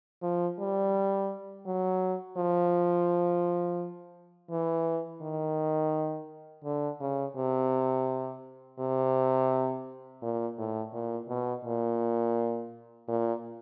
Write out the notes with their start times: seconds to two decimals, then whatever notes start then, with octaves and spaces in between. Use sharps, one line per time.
0.22 F3
0.59 G3
1.66 F#3
2.37 F3
4.50 E3
5.22 D#3
6.65 D3
7.01 C#3
7.36 C3
8.79 C3
10.22 A#2
10.58 A2
10.93 A#2
11.28 B2
11.65 A#2
13.08 A#2